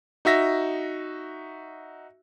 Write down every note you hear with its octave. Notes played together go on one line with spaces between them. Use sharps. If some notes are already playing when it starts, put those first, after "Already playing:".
D#4 F#4 E5 A#6